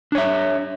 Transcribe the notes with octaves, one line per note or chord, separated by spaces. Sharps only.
D4 C#5 E5